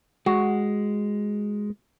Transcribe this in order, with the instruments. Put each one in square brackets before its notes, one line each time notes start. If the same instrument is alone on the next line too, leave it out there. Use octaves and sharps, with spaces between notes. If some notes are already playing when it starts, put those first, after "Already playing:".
[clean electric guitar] G#3 [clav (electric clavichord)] F#4